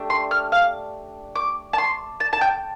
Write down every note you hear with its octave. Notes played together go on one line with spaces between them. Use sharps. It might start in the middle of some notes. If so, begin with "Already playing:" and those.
Already playing: A3 D4 G4
C6
F6
F5
D6
A5
C6
A5
A5
G5